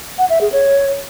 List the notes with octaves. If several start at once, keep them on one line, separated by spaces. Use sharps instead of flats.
F#5
E5
G#4
C#5